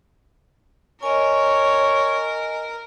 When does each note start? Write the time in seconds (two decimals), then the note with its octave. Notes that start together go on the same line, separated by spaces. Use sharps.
1.03 A#4 C#5 D#5 G#5